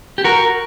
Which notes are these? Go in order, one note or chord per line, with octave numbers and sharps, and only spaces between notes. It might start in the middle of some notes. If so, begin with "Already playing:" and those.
G4
F#4 A#4